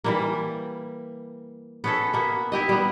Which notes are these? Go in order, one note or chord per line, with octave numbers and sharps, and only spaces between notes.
E3 G3 A#3
B3 C#4 A4
A#3 B3
E4 G4 D#5
G3 B3